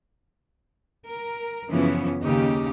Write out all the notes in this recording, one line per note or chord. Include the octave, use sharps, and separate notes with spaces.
A#4
F#2 C#3 E3 F3 B3 C#4
D#2 C#3 D#4 G4